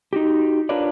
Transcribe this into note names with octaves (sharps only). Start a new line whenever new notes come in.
D#4 F#4 G4
D4 F4 A#4 B4 C#5 D5